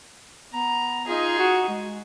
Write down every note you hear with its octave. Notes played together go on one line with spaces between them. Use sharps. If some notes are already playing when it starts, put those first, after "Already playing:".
B3 A#5
D#4 F4 G#4
F#4
G#3